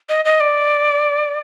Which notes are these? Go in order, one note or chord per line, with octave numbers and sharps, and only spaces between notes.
D#5
D#5
D5